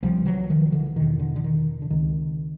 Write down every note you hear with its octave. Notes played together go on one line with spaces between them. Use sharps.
C2 C3 F3 G3
E3 F#3
D#3 F3
D3 E3
E2 B2 D#3
D3
D3
D#3
D3
C#2 C3 D#3